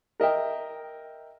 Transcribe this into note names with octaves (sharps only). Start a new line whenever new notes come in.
A#4 D#5 E5 G5